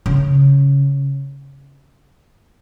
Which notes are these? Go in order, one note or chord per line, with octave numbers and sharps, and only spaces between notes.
C#3